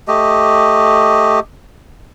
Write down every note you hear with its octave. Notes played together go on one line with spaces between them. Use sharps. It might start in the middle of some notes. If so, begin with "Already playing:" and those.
A3 G4 D#5